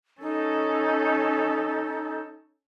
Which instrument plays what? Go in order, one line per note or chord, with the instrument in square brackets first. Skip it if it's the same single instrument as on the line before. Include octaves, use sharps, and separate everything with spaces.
[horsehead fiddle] C#4 A4 [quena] D#4